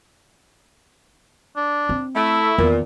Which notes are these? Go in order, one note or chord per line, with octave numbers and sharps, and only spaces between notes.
D4
C4
A3 E4
E2 A#2 D#3